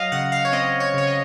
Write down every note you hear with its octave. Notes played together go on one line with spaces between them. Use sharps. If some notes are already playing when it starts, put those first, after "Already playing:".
Already playing: F#3 D#5 F5
C#3 F#5
F5
C#5
C4 D#5
C#5
C#3 C#5
D#5